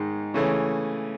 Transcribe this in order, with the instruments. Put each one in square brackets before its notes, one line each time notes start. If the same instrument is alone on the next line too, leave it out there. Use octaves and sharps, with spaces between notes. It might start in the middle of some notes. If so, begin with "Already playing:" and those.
Already playing: [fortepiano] G#2 D#3 G#3
C#3 E3 A3 C#4